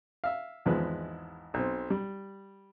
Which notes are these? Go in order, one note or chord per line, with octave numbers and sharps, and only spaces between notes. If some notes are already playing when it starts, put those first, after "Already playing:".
E5 F5
G#1 E2 F3 G#3 B4
B1 C4
G3